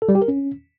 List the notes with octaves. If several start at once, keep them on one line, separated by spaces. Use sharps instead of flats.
A4
G3
G4
A#4
C#4